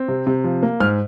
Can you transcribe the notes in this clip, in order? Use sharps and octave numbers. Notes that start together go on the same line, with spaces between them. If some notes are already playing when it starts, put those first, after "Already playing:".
Already playing: C4
C3
C3
F3
A#3
G#2 F6